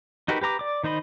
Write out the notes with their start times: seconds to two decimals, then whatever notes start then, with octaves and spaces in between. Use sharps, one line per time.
0.28 D#4 F#4 G4 A#4 B4
0.41 G4 B4 A#5 D6
0.59 D5 D6
0.84 D#3 D#4 C5 D#5 B5